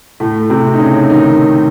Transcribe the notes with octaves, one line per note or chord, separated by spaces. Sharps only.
A2 A3
C3 C4
D#4
C#3 C#4
D#3 D#4